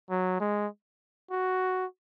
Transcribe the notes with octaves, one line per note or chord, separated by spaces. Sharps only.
F#3
G#3
F#4